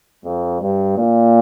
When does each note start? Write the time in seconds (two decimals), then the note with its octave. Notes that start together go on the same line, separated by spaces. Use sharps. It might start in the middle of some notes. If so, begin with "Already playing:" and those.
0.24 F2
0.61 G2
0.97 A#2